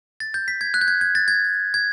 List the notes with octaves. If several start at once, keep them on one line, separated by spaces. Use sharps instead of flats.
A6
G6
B6
G#6
F#6
G6
G#6
G#6
A6
G#6
G#6